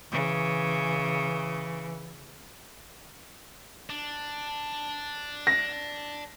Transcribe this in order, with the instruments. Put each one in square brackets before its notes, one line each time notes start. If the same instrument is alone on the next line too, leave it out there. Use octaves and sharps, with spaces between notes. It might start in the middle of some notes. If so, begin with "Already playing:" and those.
[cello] C#3 [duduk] E3
[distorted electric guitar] D4
[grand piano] A#6